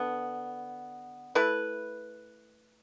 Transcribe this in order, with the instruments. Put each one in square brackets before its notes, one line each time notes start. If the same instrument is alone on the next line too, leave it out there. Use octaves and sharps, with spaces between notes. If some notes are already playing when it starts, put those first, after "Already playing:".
Already playing: [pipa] D3 B3
A3 E4 B4